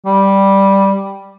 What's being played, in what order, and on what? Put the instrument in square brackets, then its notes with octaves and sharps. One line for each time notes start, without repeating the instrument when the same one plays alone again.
[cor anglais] G3